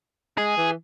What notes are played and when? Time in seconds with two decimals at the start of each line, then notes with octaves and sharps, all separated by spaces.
0.38 G#3 G#4
0.57 E3